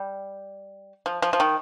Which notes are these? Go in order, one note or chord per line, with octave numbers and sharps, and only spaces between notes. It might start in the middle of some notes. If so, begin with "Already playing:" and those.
Already playing: G3
F3
F3
F3
D#3